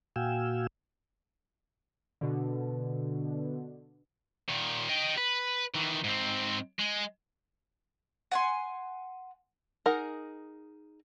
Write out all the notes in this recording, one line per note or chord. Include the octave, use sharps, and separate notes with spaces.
A#2 F#4 F5 G5 G#5 E6
B2 D3
A#2 D#3
D#5 G5
B4
D#3 E3
G#2 C4
G#3
F#5 G#5 C6
D#4 G#4 A#4 F#5